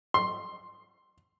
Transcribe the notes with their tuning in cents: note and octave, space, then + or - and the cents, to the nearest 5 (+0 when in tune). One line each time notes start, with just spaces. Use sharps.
C6 +5